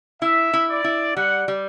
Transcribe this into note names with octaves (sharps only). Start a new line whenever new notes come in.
E4 E5
E4
D5
E4
G3 F#5
G3